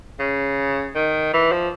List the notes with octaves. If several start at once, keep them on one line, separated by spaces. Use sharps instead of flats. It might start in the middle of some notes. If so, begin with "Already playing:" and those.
C#3
D#3
E3
F3